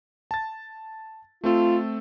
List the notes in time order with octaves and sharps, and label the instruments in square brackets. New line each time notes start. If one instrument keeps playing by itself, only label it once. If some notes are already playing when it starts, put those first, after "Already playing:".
[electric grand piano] A5 A6
[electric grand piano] A3 C4 A4 [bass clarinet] F4